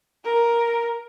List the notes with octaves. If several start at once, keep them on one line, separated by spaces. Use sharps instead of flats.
A#4